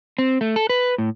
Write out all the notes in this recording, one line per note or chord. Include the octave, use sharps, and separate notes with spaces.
C4
A3
A4
B4
A2